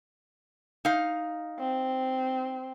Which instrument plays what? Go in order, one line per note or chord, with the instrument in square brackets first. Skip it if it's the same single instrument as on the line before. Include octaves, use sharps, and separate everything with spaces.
[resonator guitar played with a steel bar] D#4 F5
[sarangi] C4